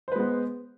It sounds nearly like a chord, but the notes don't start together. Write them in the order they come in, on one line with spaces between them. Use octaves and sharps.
C5 B4 G#3 B3